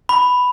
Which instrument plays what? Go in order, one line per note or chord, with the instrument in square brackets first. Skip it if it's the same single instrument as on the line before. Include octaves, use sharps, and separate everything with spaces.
[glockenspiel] B5